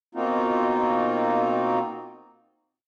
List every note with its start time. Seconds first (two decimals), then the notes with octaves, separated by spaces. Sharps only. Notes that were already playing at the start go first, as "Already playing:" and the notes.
0.15 B2 A#3 C4 D#4 F4 F#4